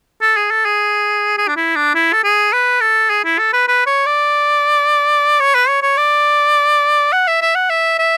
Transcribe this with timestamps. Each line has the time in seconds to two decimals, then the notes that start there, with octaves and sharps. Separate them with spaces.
0.22 A4
0.37 G#4
0.51 A4
0.65 G#4
1.38 G#4
1.48 D4
1.56 E4
1.76 D4
1.95 E4
2.13 A4
2.24 G#4
2.53 B4
2.81 A4
3.10 G#4
3.24 E4
3.39 A4
3.53 B4
3.68 B4
3.86 C#5
4.06 D5
5.40 C#5
5.55 B4
5.68 C#5
5.82 C#5
5.97 D5
7.12 F#5
7.28 E5
7.42 E5
7.55 F#5
7.70 E5
7.98 E5